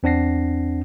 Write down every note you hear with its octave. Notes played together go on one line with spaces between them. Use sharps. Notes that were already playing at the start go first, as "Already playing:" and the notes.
E2 C4 D4 F#5 A#6 C7